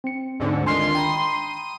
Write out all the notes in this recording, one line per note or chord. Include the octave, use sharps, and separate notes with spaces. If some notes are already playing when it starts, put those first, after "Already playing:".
C4 C#7
D2 G#2 D3
D#3 G#3 D4 F4 C6
G5 A#5 B5 D#6